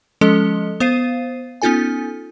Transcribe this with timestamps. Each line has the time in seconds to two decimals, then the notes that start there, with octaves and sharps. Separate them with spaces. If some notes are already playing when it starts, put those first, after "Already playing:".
0.21 F3 G#3 C#4 A4 D#5
0.80 B3 C5 F5 C7 D#7
1.62 B3 C#4 D#4 F4 A4 G#5